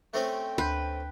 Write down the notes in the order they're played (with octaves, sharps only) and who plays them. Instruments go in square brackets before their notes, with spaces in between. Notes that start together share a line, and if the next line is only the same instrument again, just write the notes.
[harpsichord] A3 C4 C#4 [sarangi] G5
[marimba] D2 C6 G6 [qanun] B4